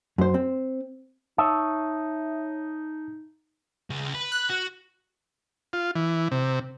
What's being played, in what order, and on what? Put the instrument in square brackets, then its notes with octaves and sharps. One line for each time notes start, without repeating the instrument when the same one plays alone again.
[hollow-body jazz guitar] F#2 C5
C4
[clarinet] D#4 [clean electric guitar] C#5 E5 [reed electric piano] A5 D#6
[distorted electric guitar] C#2
B4
[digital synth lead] F#6
[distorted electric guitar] F#4
[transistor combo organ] F4
E3
C3